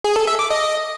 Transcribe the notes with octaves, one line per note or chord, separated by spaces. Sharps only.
G#4
A4
E5
D6
D#5